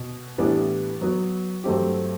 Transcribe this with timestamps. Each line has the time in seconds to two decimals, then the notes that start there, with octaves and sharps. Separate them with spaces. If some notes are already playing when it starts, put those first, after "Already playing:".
Already playing: B2
0.38 A2 E3 G3 B3 D4
1.01 F#3 B3 F#4
1.64 G2 F#3 A3 C4 G4